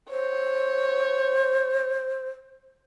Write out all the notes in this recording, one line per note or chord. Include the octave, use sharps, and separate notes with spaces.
C5 C#5